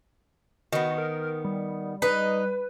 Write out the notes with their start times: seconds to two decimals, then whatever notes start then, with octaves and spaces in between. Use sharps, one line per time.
0.73 D#3 B3 F#4
0.98 A#4
1.45 G3
2.02 D#4 B4